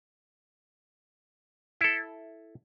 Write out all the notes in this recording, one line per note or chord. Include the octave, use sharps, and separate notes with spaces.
E4 A4